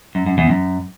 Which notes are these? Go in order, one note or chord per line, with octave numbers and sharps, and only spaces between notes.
F#2
F#2
E2
F#2